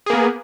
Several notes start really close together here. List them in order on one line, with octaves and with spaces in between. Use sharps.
G#4 A#3 B3